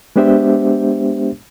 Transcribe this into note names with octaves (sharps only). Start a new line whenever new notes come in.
G#3 B3 D4 G4 C5 E5